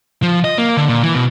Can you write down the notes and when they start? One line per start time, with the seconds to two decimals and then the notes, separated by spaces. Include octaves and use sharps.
0.23 F3
0.44 D#5
0.58 A#3
0.77 D3
0.89 A#2
1.04 E3
1.15 B2